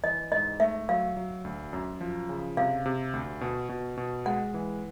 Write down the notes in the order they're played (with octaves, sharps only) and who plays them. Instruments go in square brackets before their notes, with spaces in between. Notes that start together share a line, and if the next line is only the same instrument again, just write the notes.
[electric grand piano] E3 [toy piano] D#5
[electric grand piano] G#2 [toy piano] D#5
[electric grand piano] A3 [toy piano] E5
[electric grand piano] F#3 [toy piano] F5
[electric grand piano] F#3
D2
F#2
F3
C#3
[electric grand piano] C3 [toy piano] F5
[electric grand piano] C3
D2
B2
B2
B2
[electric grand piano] G#3 [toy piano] F#5
[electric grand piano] E3